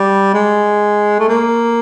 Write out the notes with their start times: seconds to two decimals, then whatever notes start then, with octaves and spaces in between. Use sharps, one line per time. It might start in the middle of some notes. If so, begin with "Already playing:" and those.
Already playing: G3
0.34 G#3
1.20 A3
1.28 A#3